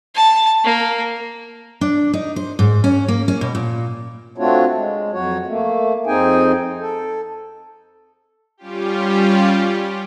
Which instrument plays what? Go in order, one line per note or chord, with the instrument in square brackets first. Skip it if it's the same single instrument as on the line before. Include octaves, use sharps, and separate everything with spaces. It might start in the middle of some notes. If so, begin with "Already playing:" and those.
[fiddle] A5
A#3
[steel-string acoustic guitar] D4
D#4
C5
G#2
C#4
A#3
C#4
B2
A#2
[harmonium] A3 C4 D4 F4 F#4 C#5
G#3
F2 F#3 F#4 C#5
A3 A#3
F2 C4 D#4 G#4 G5 G#5
A4
[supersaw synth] G3 C#4 F4 G4